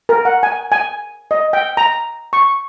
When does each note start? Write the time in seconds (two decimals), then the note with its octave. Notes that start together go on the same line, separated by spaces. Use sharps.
0.09 A#4
0.25 F#5
0.43 G#5
0.72 G#5
1.31 D#5
1.53 G5
1.77 A#5
2.33 C#6